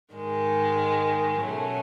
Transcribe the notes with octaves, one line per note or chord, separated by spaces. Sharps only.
G#2 D#3 G#3
B2 F#3 A3 C#4